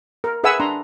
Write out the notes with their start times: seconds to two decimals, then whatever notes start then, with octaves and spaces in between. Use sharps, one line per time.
0.24 A#4
0.44 G#4 B4 E5 F#5 G#5 E6
0.60 D4 A#5 C6